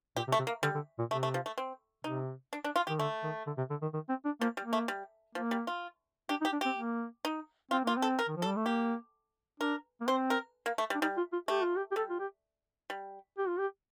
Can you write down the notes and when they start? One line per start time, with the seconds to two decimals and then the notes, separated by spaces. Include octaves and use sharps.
0.16 A#2 G4
0.27 C3
0.32 A3
0.39 C3
0.47 A#3
0.63 D3 G3
0.75 D3
0.99 A#2
1.10 C3 A3
1.23 A3
1.34 F3
1.46 A3
1.58 C4
2.04 C3 D#4
2.53 D4
2.64 D4
2.76 F4
2.87 D#3 G4
2.99 D3 A3
3.23 D#3
3.46 D3
3.58 C3
3.70 D3
3.82 D#3
3.94 D#3
4.09 C4
4.25 D4
4.41 F3 A#3
4.57 G3
4.64 A#3
4.73 A3
4.88 G3
5.35 F3 A#3
5.51 G3
5.67 F4
6.29 D4 G4
6.41 D#4
6.45 G4
6.53 D4
6.61 C4 G4
6.77 A#3
7.25 D#4
7.71 C4 F4
7.84 A#3 F4
7.97 C4
8.02 A4
8.19 A#4
8.28 D#3
8.37 F3
8.42 A4
8.47 G3
8.56 A3
8.66 A#3 G4
9.60 D4 A#4
10.01 A#3
10.07 C4 C5
10.30 A#4
10.66 A#3
10.78 A3
10.90 G3
10.95 D4
11.01 G3 D#4
11.17 F4
11.33 F4
11.48 A3 G4
11.63 F4
11.76 G4
11.91 G4
11.96 G3 A4
12.10 F4
12.19 G4
12.90 G3
13.38 G4
13.48 F4
13.59 G4